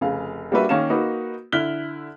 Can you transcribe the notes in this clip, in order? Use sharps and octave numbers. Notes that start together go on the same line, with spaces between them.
F1 C#3 F5
G3 A#3 D4 F#4 B4 E5
D#3 A#3 C#4 F5 E7
A#3 D#4 F#4 B4
D3 E4 F6 F#6 B6 G7